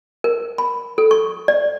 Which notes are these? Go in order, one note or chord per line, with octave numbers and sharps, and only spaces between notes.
A#4
B5
A4
C#6
D5